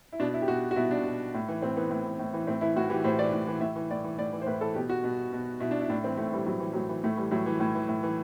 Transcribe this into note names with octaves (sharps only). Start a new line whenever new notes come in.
E4
B2 D4
E4
G4
B2 F#4
F#4
B2 E4
D4
B2
A2
E3
A2 C4
E3 B3
A2
E3
A2
E3
A2 C4
E3 E4
A2 F#4
E3 G4
A2 C5
E3 D5
A2
E3
A2 E5
E3
A2 D5
E3
A2 D5
E3
C5
A2 B4
E3 A4
B2 G4
F#4
B2
B2
B2 E4
D4
E4
A2 D4
E3 C4
A2 A3
E3 G3
A2 F#3
E3
A2 F#3
E3
A2 A3
E3 G3
A2 F#3
E3
A2
E3
A2
E3